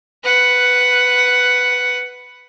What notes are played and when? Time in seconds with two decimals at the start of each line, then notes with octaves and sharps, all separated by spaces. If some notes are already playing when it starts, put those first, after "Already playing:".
0.24 B4 F#5